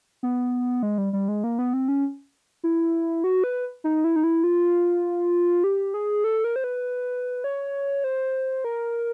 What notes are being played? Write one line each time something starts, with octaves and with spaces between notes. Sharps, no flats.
B3
G#3
G3
G3
G#3
A#3
B3
C4
C#4
E4
F#4
B4
D#4
E4
D#4
E4
F4
G4
G#4
A4
A#4
C5
B4
C#5
C5
A#4